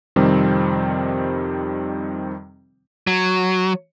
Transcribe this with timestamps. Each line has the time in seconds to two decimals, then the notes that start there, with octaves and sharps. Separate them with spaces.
0.16 F2 C3 D#3 G3 C4
3.07 F#3